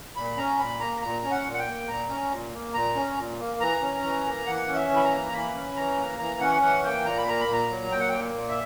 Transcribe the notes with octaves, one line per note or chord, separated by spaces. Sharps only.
A#2 B5
C#4 A#5
A#2 B5
A#3 A#5
A#2 A#5
C#4
F#5
A#2
F#5
G5
A#3
A#2 A#5
C#4
A#2
A#3
A#2 A#5
C#4
A#2
A#3
E3 A#5
C#4
E3
A#3
E3 F#5
C#4
E5
E3
B5
A#5
A#3
E3 B5
C#4
E3 A#5
A#3
E3 A#5
C#4 F#5
E3 F#5
A#3 G5
A#2 A#5
B5
A#3 A#5
B5
A#2 A#5
F#3
A#2 G5
F#5
A#3 G5
A#2
E5